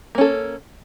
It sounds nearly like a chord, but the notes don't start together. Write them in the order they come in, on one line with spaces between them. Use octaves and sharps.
A#3 C#4 A4